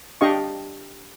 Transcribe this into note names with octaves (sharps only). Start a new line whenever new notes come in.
D4 G4 D#5 F5 C#6